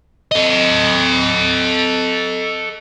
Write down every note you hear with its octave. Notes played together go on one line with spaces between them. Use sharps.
A4 D#5